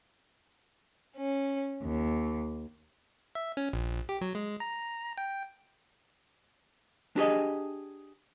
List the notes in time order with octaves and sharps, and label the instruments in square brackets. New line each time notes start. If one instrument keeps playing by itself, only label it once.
[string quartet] C#4
D#2
[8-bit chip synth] E5
C#4
A#1
G4
F#3
G#3
A#5
G5
[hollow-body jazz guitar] D4 G4 G#4 D#5